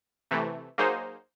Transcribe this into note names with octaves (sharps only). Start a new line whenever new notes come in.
C3 E3 A3
F#3 A#3 D#4 G#4 C5